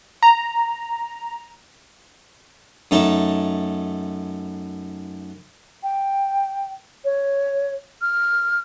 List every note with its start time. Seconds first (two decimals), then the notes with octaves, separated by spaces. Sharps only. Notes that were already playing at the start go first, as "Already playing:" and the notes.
0.23 A#5
2.91 F#2 A3 D#4 A5
5.83 G5
7.05 C#5
8.01 F6